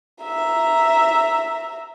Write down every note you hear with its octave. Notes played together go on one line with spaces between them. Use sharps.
E5 A#5